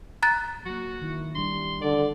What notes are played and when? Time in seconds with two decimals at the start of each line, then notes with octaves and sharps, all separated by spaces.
0.23 A#5 F#6 A6
0.66 F#3 A#3 F#4
1.02 D#3 E4
1.35 G3 D4 C6
1.82 D3 D5